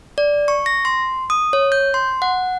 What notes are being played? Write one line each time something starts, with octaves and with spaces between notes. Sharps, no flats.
D5
C#6
A#6
C6
D#6
C#5
G6
C6
F#5